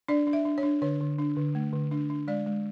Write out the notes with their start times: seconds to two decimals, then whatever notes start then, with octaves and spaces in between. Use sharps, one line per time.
0.08 D4 D5
0.27 D4
0.33 E5
0.45 D4
0.58 C#5
0.63 D4
0.82 D3 C#5
1.01 D3
1.19 D4
1.37 D3
1.55 A3
1.73 D3
1.91 D4
2.10 D4
2.28 G#3 D5
2.47 G#3